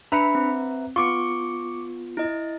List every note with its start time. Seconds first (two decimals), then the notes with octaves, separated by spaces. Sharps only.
0.12 D4 B4 E5 A#5 B5 C#7
0.35 C4
0.96 B3 F4 C#6 D6 C#7
2.17 E4 D#5